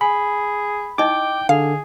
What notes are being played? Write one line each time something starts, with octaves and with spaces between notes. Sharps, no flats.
G#4 G#5 B5
D#4 E4 D#5 G5 D6
D3 G#4 F5